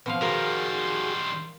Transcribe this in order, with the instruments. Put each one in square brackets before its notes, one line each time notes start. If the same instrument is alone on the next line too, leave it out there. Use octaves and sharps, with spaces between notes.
[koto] B2 F3 F5 [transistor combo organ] B3 C4
[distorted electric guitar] D#3 G3 [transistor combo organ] F#4 G#4 [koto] A#4 [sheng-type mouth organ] C6